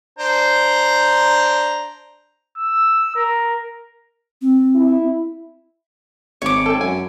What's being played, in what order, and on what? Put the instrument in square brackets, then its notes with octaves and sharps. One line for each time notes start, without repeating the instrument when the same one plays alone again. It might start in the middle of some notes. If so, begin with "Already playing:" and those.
[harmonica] D4 C5 A#5
[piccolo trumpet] E6
A#4
[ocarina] C4
[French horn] E4
[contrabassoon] G#1 [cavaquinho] C#5 D6
[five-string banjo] C4 A4
[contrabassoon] F#2 [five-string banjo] G#5